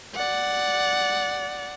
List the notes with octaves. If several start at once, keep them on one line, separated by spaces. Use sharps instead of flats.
D5 F#5